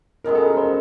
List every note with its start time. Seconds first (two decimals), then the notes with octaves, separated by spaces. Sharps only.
0.24 F#2 D#3 G#3 B3 A#4
0.35 A4
0.47 A#4
0.57 C5